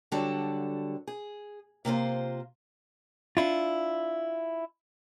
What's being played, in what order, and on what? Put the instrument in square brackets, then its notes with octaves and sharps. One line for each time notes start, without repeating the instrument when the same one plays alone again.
[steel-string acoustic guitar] D3 F#3 G3 F#4 A4 A5
G#4
C3 A#3 F4 C5
[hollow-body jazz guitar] D4 E4 F4